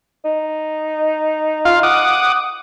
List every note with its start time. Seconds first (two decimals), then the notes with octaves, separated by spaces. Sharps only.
0.25 D#4
1.65 F4 F5
1.83 F#5 D6 D#6